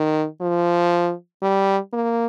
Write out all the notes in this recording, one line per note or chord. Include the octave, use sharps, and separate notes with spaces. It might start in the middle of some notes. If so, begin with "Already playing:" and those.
Already playing: D#3
F3
G3
A#3